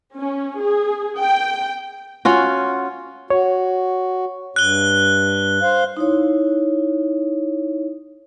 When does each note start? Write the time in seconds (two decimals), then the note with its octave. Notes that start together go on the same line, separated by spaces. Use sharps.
0.17 C#4
0.60 G#4
1.20 G5
2.25 C#4 F4 F#4
3.30 F#4 C#5
4.56 G2 F#6 G7
5.62 C5 F5
5.97 D#4 E4 C#5